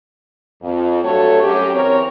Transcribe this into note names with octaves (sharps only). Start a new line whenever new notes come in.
F2
G2 F#3 A3 F#4 A4 C#5
F#2 G4
E2 C4 A#4 C#5